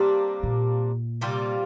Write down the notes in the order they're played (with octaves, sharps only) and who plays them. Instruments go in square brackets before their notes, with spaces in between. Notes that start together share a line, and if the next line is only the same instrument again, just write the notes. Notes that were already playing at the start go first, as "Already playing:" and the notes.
Already playing: [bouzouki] C3 G3 A#3 D4
[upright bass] A#2
[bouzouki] C3 G3 A#3 F4